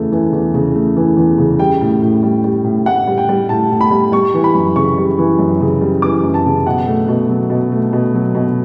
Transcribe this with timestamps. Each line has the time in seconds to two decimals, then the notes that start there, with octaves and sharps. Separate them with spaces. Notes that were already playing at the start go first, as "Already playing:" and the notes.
Already playing: E2 C#3 E3 A3
0.12 E3
0.33 E2
0.54 C#3
0.75 A3
0.97 E3
1.17 E2
1.38 C#3
1.59 G3 G5
1.81 A2
2.02 A2
2.23 G3
2.44 G3
2.64 A2
2.86 A2 F#5
3.07 G3
3.18 G5
3.29 G3
3.49 A2 A5
3.71 A2
3.81 B5
3.91 G3
4.12 G3 C#6
4.34 E3
4.44 B5
4.55 F#2
4.76 C#3 C#6
4.98 G3
5.19 E3
5.39 F#2
5.60 C#3
5.81 G3
6.02 E3 D6
6.23 F#2
6.34 A5
6.45 C#3
6.66 B2 F#5
6.87 A3
7.08 B2
7.29 F#3
7.50 B2
7.72 A3
7.93 B2
8.14 F#3
8.35 B2